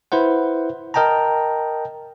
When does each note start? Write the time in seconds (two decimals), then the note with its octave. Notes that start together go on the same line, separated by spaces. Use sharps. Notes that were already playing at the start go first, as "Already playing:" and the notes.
0.12 E4 B4 C5 F#5
0.94 A#4 D#5 G5 A5 A#5